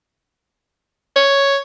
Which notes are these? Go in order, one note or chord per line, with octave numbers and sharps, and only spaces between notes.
C#5